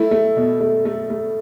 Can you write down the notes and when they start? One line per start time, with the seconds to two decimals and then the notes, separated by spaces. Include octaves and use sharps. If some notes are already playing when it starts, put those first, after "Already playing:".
Already playing: A3 E4
0.11 A3
0.36 B2
0.60 A3
0.85 A3
1.10 A3